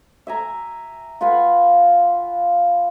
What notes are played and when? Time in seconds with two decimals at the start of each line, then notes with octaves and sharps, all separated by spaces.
0.27 E5 G#5 A#5
1.21 F4 B4 F#5 G#5